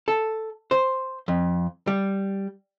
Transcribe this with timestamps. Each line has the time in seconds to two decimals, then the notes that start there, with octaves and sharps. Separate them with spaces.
0.08 A4
0.71 C5
1.28 F2
1.87 G3